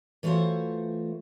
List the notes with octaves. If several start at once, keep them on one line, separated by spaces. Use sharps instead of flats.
E3 A3 F4 F#4 C5 C#5